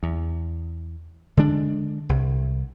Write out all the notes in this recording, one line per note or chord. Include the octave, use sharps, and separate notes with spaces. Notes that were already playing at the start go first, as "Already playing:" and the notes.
E2
D3 G#3 D4
C2